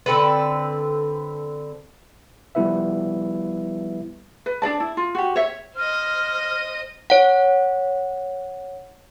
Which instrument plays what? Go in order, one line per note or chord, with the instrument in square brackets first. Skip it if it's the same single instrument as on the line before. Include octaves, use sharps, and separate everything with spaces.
[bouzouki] D3 C4 A4 B4
[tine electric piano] F3 G3 B3 E4 B4 E5
[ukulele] B4
D4 G#4 D5 A5
E4
F4
F#4 G4
C#5 E5
[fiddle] C5 D#5 [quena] F6
[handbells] C#5 F#5